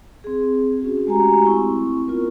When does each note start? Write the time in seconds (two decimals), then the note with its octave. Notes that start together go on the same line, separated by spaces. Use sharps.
0.24 C4 G#4
0.80 C#4 F#4 G#4
1.07 G#3 A3 F#4 G4 G#5 A#5
1.44 C4 E4 C#6
2.08 B3 F4 A#4